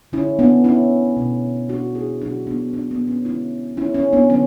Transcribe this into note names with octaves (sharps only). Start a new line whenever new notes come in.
D3 A3 C#4 E4
B3 D4
C#4 E4
B2 A3
D4 F#4
E4 G#4
B2 F#3 A3 D4 F#4
B3 D4
B3 D4
B3
C#4
D3 G#3 C#4 E4
C#4 E4
C#4
B3 D4
D3 F#3 C#4